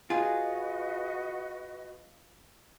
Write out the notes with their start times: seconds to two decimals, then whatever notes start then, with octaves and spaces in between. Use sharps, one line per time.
0.10 F4 F#4 G#4 B4 D#5